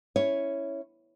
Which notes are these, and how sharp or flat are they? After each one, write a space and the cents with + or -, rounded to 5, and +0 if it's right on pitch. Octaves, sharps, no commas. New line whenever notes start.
C#4 +0 E4 +0 C#5 +0